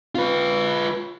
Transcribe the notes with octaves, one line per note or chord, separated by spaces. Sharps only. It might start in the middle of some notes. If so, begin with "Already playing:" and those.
F4 B4